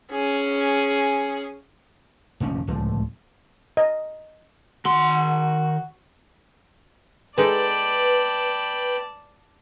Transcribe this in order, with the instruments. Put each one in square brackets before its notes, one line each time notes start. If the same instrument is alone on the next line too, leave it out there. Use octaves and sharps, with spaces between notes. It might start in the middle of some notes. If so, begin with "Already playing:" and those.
[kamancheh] C#4 G#4
[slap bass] F1 A#1 D#3 C#4
D1 C#2 A2 F3
[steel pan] D#5
[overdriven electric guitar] D#3 C6 [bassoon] F#4
[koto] G#3 D#4 A4 [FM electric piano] B4 [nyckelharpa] D5 A5 [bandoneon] G5 B5